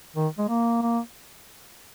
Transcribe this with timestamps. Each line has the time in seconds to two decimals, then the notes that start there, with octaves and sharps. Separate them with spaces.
0.16 D#3
0.38 G#3
0.49 A#3
0.82 A#3